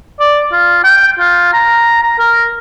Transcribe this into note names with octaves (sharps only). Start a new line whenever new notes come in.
D5
F4
G5
F4
A#5
A#5
A#4